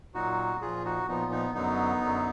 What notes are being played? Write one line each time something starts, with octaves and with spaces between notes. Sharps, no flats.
A#2 F#3 D#4 F#4
A#2 F3 F4 G#4
D#4 F#4
A#2 F3 B3 D#4
B3 D#4
F#2 D3 F#3 B3 D#4
F#2 D3 F#3